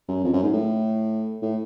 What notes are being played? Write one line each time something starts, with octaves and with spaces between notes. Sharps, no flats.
F#2
F2
F#2
G#2
A2
A2